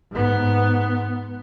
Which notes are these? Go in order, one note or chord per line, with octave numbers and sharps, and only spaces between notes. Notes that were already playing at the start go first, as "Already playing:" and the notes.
G#2 B3